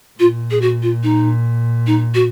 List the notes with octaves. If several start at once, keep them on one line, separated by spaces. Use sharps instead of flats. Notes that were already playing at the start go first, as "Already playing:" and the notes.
A#2 F4
G#4
F#4
F4
D#4
D#4
F#4